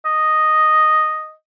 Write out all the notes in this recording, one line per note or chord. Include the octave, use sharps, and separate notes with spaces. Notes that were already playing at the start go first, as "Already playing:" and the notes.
D#5